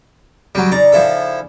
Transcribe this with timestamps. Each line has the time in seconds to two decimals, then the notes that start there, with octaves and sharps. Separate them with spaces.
0.55 C#3 F#3 G3
0.72 C#3 D#4 D5 A#5
0.92 F3 E4 A4